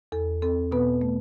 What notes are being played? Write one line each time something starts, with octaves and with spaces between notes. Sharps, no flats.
E2 A4
C4 A4
B2 B3 B4
A3